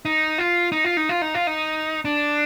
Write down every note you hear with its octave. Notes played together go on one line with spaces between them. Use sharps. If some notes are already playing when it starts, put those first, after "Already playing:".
D#4
F4
D#4
F4
D#4
F4
D#4
F4
D#4
D4